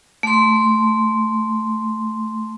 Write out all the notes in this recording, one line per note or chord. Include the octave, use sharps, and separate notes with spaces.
A3 C6